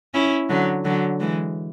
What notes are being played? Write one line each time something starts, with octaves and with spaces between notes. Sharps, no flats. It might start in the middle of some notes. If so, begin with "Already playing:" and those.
C#4 E4
D3 F#3
D3 F#3
E3 G#3